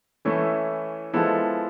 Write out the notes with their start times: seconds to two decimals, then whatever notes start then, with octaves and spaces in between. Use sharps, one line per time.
0.25 E3 A3 C#4 E4
1.14 F3 G#3 B3 E4 A4